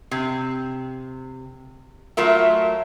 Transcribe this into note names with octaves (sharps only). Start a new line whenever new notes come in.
C3
F#3 A3 F4 A#4 E5